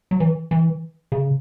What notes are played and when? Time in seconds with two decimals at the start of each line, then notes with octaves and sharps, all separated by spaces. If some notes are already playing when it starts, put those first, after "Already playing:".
0.11 F#3
0.20 E3
0.51 E3
1.12 C#3